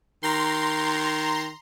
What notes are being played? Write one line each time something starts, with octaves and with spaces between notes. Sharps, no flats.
D#3 A#5 C6